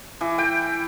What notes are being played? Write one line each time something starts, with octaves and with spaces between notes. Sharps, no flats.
E3
G5